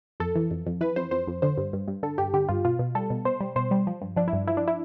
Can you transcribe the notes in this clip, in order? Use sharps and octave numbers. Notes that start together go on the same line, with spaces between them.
F2 A4
E3
F2
F2
E3 B4
F2 C5
F2 C5
F2
D3 C5
G2
G2
G2
D3 A4
G2 G4
D3 G4
G2 F4
B2 F4
B2
G3 A4
B2
B2 C5
G3
B2 C5
G3
F3
G2
F3 D4
E4
G2
F3 E4
D4
E4